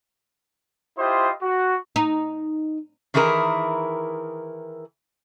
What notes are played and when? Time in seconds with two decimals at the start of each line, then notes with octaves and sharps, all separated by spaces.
0.98 E4 F4 G4 C5 D#5
1.43 F#4
1.96 D#4
3.14 D#3 E3 E4 G#4 A#4